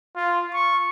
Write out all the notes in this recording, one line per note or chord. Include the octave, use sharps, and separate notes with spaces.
F4
C#6